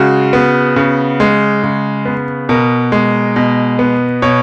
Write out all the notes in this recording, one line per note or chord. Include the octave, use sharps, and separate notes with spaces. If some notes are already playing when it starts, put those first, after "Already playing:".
Already playing: C#3 G#3 F#4
B3
C#3
G#3
C#3
B3
B2 A#4
G#3
B2
B3
B2 C#5